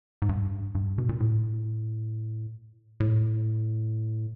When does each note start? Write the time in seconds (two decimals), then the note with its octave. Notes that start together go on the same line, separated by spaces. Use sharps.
0.22 G#2
0.29 G2
0.75 G2
0.98 B2
1.09 A#2
1.20 A2
3.00 A2